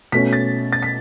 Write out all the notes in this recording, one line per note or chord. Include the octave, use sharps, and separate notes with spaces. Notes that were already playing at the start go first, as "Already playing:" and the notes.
B2 A3 C#4 B6
A6
A6
B6